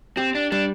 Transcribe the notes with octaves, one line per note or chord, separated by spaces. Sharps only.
C4 G4
D4
G3 D4